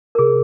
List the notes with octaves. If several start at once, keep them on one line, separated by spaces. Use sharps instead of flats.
A#4
C3 G#4